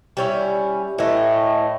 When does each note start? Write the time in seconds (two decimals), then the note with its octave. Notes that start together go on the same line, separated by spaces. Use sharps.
0.17 G3 C#4 E4
0.98 A2 E3 A3 D#5